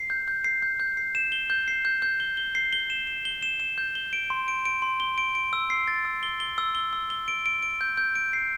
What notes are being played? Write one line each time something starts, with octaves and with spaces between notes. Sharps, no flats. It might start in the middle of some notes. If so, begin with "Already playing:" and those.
Already playing: C7
G6
G6
C7
G6
G6
C7
E7
G7
G6
C7
G6
G6
G7
G7
C7
G7
E7
E7
G7
E7
E7
G6
G7
D7
C6
D7
D7
C6
G7
D7
D7
E6
C7
A6
E6
G7
G7
E6
G7
E6
G7
D7
D7
D7
G6
G6
D7
C7